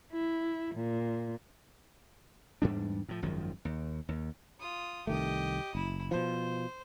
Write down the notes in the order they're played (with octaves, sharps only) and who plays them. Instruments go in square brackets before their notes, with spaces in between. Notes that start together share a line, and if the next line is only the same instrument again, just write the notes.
[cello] E4
A#2
[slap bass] E2 G#2 G3 D4
A2 F3
G#1 F#2 D#3 F3
D#2
D#2
[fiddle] F4 D#6
[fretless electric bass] C2 D#3 A3 [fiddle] G4 D#5
[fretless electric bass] F#1 [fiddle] E4
[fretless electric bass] B2 F3 [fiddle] C5